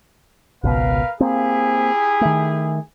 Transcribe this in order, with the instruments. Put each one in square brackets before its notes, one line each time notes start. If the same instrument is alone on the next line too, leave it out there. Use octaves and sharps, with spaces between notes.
[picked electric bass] G#1 C#2 B2 [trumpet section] A#4 B4 F5
[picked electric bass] A#3 C4 [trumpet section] E4 G4 G#4
[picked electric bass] D#3 A3